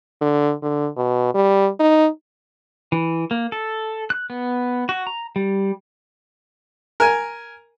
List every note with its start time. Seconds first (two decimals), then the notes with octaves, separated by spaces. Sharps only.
0.21 D3
0.62 D3
0.97 B2
1.34 G3
1.79 D#4
2.92 E3
3.31 A#3
3.52 A4
4.10 F#6
4.30 B3
4.89 F#4
5.07 A#5
5.36 G3
7.00 A#4 G#5